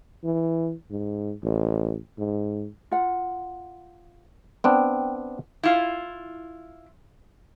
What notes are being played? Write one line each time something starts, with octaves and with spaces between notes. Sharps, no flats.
E3
G#2
A1
G#2
F4 F#5
B3 C4 D4 G5
E4 F4